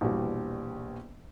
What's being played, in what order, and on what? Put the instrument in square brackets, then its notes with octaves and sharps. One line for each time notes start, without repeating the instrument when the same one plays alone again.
[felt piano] A#1 E2 B2 G3